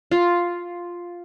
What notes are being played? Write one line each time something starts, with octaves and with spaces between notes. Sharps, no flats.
F4